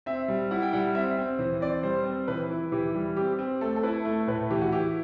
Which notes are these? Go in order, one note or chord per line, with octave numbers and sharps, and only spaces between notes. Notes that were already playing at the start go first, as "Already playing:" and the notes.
C4 E5
G3
E4 F#5
G5
G3 F#5
C4 E5
C4
E3 C5
C4 D5
G3 C5
C4
E3 B4
E4
E3 G4
G3
C4 G4
C4
A3 A4
A4
E4 B4
A3
A2 B4
E3 G4
F#4
E4 G4